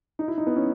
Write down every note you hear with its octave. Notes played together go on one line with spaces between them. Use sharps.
D#4
E4
D#4
B3
C#4